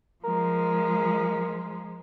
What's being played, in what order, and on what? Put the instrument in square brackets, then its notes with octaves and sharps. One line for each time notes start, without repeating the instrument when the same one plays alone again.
[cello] F3 G#3 [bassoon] A#4